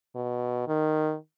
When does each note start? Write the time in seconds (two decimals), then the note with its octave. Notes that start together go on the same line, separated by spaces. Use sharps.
0.15 B2
0.68 D#3